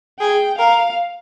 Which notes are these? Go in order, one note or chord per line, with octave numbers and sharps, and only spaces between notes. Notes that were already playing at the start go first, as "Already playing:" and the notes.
G#4 G5
A#4 F5